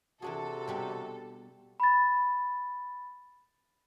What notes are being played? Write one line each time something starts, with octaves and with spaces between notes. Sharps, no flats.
C3 E3 D4 F#4 G#4 A4
B2 G3 D4
B5 A6